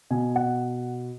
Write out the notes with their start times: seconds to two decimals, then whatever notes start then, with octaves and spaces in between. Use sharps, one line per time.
0.10 B2 G#5
0.36 F#5